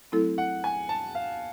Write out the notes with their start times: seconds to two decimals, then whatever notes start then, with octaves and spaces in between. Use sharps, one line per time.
0.12 F#3 A3 C4 E4 A4
0.38 F#5
0.64 G#5
0.89 A5
1.15 F5